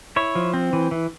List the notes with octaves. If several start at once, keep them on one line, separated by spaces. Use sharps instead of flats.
E4 C#5
F3
C4
E3
E3